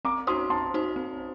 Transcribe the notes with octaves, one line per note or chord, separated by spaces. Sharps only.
C4 A#5 D6
D#4 F#4 C5 C6 D#6
C4 A5 C6
D#4 F#4 C5
C4